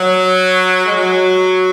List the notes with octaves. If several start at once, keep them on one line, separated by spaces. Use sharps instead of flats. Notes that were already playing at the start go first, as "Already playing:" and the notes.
Already playing: F#3
G#3
F#3